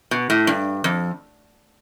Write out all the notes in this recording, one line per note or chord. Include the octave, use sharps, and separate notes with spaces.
B2
A2
G2
F2